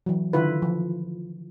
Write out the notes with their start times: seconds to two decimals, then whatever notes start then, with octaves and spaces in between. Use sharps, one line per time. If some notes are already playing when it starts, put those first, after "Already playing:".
0.06 E3 F#3
0.33 D3 D#3 E4 F4 B4
0.62 F3